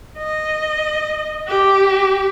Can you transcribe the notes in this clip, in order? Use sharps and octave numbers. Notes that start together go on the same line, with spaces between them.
D#5
G4